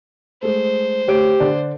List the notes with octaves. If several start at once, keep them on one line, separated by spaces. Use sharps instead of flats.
G#3 A3 C5
D2 G4 C#5 D7
D3 D4 D5